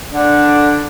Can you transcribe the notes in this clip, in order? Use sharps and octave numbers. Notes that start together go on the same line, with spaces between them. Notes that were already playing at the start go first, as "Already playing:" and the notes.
D3 D4